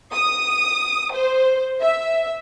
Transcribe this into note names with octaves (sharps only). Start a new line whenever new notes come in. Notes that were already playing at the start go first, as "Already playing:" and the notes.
D#6
C5
E5